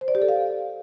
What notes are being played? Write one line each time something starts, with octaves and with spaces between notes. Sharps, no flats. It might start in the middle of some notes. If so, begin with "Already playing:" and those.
C5
D5
G4
A4
F5